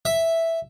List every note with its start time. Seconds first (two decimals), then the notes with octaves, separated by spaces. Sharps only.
0.05 E5